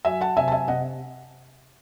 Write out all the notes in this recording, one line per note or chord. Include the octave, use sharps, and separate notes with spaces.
F#3 E5 G#5
F#5 A5
C3 E5 G#5
A5
E5 G#5
C3 D#5 F#5